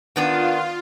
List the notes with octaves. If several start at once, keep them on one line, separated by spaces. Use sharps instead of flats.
D#3 B3 D4 F4